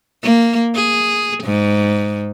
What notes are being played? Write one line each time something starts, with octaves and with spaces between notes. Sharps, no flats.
A#3
G#4
G#2